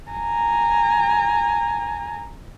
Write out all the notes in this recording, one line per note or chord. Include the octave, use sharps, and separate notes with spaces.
G#5 A#5